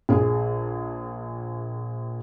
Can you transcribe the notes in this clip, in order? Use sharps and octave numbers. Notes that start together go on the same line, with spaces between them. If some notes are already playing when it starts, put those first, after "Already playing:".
A#1 G#4